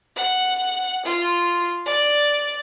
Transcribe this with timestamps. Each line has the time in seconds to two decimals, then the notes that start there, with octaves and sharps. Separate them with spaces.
0.16 F#5
1.05 F4
1.86 D5